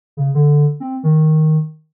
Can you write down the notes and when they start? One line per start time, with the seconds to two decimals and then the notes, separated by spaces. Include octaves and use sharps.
0.17 C#3
0.34 D3
0.80 C4
1.03 D#3